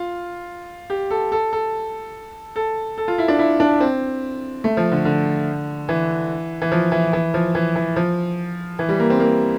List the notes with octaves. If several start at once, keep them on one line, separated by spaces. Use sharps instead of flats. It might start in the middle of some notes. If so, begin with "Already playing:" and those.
Already playing: F4
G4
A4
A4
A4
A4
A4
F4
E4
D4
E4
D4
C4
A3
F3
D3
D3
E3
E3
F3
E3
E3
F3
E3
E3
F3
E3
G3
A#3
C4
A#3